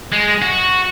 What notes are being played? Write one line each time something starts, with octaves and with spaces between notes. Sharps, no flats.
G#3
F#4